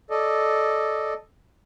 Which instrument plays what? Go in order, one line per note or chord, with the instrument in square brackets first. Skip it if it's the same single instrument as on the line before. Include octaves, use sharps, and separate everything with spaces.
[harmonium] A4 D5 D#5